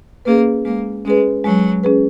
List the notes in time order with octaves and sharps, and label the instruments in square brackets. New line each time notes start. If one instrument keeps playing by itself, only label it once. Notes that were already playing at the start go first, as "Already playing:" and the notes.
[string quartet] A#3 [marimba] C#4 G#4 B4
[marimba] G#3 [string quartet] A#3
[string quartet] G#3 [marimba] C#4 G#4 B4
[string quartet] F#3 [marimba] G#3
[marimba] C#4 G#4 B4